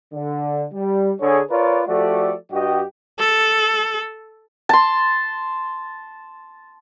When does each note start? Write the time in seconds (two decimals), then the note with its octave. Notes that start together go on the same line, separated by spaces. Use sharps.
0.14 D3
0.74 G3
1.21 D3 G#4 C#5
1.50 F4 A#4 B4 C#5 D5
1.87 F3 A3 F#4 G4 A4 D5
2.52 G2 F#4 G4 D#5
3.19 A4
4.69 A5 C6